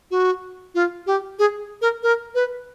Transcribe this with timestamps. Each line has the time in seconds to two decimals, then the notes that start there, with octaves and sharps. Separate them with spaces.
0.11 F#4
0.75 F4
1.07 G4
1.39 G#4
1.82 A#4
2.03 A#4
2.35 B4